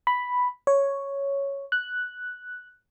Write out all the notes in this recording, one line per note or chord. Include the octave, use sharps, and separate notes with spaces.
B5
C#5
F#6